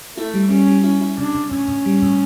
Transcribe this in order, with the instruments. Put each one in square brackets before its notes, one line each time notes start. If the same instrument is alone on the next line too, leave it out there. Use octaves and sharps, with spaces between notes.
[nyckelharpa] A3 [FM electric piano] E4
[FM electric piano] G3
[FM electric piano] G3 [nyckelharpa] C#4
[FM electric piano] G3
[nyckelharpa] C#4 [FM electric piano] E4
[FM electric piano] E4
[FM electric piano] C#3 [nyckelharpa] D4
[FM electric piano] C#3
[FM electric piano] A2 [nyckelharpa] C#4
[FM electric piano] A2
G3
A2